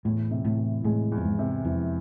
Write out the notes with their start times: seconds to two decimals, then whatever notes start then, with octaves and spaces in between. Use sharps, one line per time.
0.05 E2 A2
0.31 C3
0.45 A2
0.59 E3
0.84 A2 G#3
1.12 E2
1.17 F2
1.25 G#2
1.39 C3
1.65 F2 E3